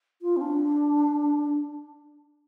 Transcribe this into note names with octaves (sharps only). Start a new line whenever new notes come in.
F4
C4
D4